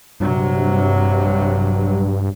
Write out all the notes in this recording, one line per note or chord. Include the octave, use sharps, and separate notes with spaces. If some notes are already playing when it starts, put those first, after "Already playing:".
A#1 G2 C3 F#3